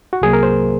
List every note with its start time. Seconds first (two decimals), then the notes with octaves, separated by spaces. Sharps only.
0.13 F#4
0.21 C2 C3 F#3 A#3 G#4
0.33 A#4
0.43 C5